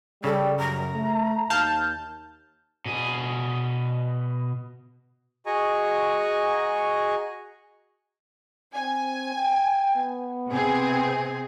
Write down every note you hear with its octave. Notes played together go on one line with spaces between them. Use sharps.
C#3 G3 A4
F#2 A#5
A3
D#2 F5 A5 F6 G6
B2 G#4
F#4 G#4 D#5 G#5 A#5 C#6
C4 G#5
G5
B3
C3 C4 G#4